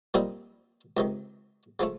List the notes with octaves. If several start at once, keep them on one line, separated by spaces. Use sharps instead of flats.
A#2 G3 C4 D#4
C#2 C3 D#3
C#3 F3 A3